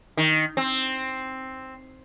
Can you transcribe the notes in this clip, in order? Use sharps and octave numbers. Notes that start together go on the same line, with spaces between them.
D#3
C4